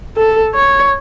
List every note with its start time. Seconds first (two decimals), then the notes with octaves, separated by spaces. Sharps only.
0.17 A4
0.55 C#5